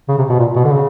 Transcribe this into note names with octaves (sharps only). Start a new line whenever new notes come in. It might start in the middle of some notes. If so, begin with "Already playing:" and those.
C#3
C3
B2
A#2
B2
D3
C#3